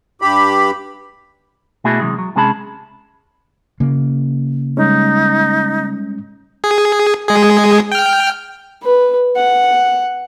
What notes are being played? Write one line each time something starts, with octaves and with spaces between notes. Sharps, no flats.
G2 G4 B5
B2 A3 A#3 E4 F#4 G#4
C3 E3 F#3 G#3
F#3
C3 G#3 C#4 G#4 A5 B5
C#3 A#3
G3 G#3 C#4 D#4
G#4
G#3 G#4
G5 F6
B4
F#5